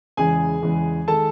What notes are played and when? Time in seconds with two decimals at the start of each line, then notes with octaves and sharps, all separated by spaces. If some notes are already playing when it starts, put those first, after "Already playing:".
0.17 E2 C#3 E3 G#3 G#4 G#5
0.62 E2 C#3 E3 G#3
1.08 D#3 G#3 A4 A5